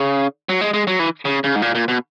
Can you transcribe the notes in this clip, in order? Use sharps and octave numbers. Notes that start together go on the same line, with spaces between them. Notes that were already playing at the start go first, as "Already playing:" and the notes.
Already playing: C#3
F#3
G#3
G#3
F#3
E3
C#3
C#3
G#2
A#2
A#2
B2